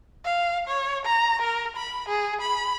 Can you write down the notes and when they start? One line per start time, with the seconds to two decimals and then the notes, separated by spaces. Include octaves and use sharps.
0.24 F5
0.68 C#5
1.05 A#5
1.42 A#4
1.76 B5
2.08 G#4
2.41 B5